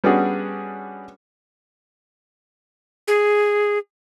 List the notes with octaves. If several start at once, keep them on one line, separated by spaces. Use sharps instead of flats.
G3 B3 C#4 D4 F#4 G#4
G#4